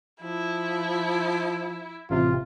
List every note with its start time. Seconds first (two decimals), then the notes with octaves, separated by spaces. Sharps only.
0.22 F3 E4
2.10 A1 C3 F4